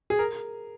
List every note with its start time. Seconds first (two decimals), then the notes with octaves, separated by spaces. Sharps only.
0.10 G#4
0.19 A#4